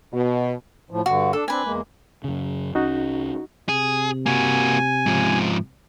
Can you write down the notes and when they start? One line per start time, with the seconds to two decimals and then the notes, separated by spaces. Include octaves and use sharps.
0.14 B2
0.91 A2 F3
1.06 G2 D3 F#4
1.33 D4 A4
1.48 C4 D4 B4 G#5
1.64 E2 G#3 A#3
2.24 F#2 C#3
2.75 C2 C#4 D#4 F#4
3.69 C3 G#4
4.26 A#3 F#4 G#5
5.06 G#2 F3